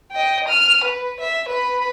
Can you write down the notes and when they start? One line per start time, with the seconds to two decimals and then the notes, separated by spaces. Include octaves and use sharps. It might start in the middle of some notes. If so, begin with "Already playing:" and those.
0.12 D#5 G5
0.48 F6 D#7
0.84 B4
1.20 E5
1.49 B4 B5